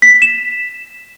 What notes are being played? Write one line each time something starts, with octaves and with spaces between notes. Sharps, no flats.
B6
E7